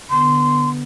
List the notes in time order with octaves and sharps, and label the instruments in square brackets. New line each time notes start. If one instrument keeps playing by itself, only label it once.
[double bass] D3 B3 [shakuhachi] C6